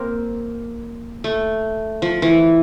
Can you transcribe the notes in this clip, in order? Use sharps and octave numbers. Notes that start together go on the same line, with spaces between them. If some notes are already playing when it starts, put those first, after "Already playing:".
Already playing: A#3 C4
A3
F3
E3